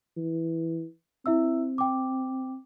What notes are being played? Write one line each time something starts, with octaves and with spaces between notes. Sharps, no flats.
E3
C4 E4 E5 E6
G5 D6